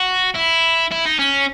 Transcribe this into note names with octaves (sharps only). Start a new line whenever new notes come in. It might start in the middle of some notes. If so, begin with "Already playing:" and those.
Already playing: F#4
E4
E4
D#4
C#4